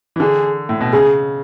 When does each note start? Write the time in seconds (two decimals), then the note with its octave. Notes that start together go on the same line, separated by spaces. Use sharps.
0.16 E3
0.20 D3 G#4
0.69 A2
0.81 B2
0.93 C#3 G#4